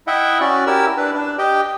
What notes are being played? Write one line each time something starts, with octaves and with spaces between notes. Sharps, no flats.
E4 D#5 E5 F#5 G5
C#4 F#4 D5
E4 G4 A#4 E6
D4 B4
D4
G4 D#5 G5